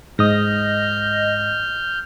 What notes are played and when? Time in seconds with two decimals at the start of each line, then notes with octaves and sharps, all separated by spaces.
0.19 G#2 D#5 F6 G6 A#6